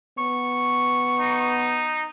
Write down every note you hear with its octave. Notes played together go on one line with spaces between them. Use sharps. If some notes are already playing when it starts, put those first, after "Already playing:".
B3 C#6
D#4